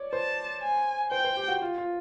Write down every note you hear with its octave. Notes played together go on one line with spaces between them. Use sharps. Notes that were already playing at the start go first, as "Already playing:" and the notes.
Already playing: C#5 D5
C5 A5
G#5
C5 G5
C5
G4
F#4
F4
F4